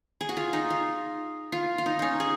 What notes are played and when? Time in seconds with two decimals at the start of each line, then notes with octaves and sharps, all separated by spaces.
0.21 G#4
0.29 F#4
0.37 F4
0.53 D#4
0.70 F4
1.52 F4
1.78 F4
1.86 D#4
1.99 C#4 D#4
2.20 G#4